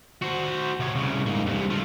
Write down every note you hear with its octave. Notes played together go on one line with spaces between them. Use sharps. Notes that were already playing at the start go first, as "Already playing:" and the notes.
F#4 C5
C3 C#5
C2 C#3
G#2 A#3
G2 C3
A3 F4